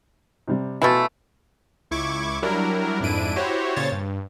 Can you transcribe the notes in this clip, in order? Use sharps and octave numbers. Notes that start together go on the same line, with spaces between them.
C3 G3
B2 E3 F3 A3
C#2 E4 C#6 D6 G#6
F#3 G3 D4 E4 A#4
F2 G#2 D4 E4 D7 D#7
E4 F#4 G4 C5 C#5
A#2 C#3 C5 C#5 A6
G2